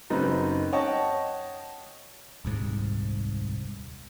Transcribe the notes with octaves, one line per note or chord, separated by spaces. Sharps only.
F#1 F#2 C4 D#4 B4
C#5 D#5 F#5 G5 A5 C#6
D#1 C2 G#2